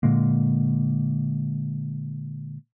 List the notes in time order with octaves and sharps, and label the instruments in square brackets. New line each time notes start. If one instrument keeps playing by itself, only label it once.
[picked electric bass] A#2 D3 G#3 A#3